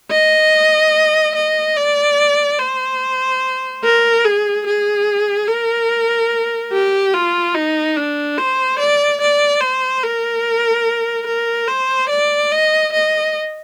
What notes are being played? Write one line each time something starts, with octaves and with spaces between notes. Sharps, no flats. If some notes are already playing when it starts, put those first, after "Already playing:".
D#5
D#5
D5
C5
A#4
G#4
G#4
A#4
G4
F4
D#4
D4
C5
D5
D5
C5
A#4
A#4
C5
D5
D#5
D#5